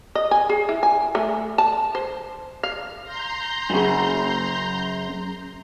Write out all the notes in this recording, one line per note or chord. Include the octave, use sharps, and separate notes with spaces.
D#5
G#5
G#4
E4
G#5
A3
A5
C5
F5
A#5 C6 G6
F#2 C#3